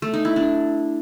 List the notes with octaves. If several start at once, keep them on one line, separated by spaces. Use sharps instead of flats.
A3
D#4
E4
D4